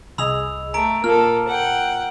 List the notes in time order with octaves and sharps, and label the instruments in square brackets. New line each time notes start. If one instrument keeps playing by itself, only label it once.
[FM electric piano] C2 G#4 D#5 [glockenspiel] B5 E6 F7
[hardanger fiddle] A3 [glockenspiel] A#5 D7
[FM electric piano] A#2 [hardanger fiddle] A#3 A4 [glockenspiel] F6
[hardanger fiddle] F#5 G5